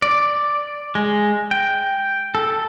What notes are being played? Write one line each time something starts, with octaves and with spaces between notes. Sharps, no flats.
D5
G#3
G5
A4